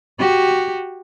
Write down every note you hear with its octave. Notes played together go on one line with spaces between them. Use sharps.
F#4 G4